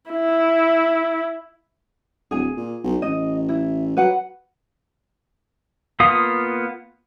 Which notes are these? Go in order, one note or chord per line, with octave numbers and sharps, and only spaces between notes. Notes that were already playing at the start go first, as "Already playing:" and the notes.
E4
D1 G#4 G#5
A#2
B1
A1 D#5
E4
F#3 B4 F#5
A#3 B3 F4 F5 D#6